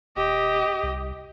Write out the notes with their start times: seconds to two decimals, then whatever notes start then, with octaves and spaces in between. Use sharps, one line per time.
0.17 D#1 G4 D#5
0.83 C2